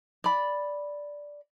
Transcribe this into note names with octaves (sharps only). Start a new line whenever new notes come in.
D5 B5